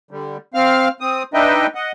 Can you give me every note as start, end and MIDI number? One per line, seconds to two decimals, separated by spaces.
0.11 0.37 50
0.11 0.37 55
0.54 0.88 60
0.54 0.88 77
0.54 0.88 89
1.01 1.23 60
1.01 1.23 87
1.34 1.67 62
1.34 1.67 63
1.34 1.67 71
1.34 1.67 75
1.34 1.67 76
1.34 1.67 79
1.75 1.92 75
1.75 1.92 78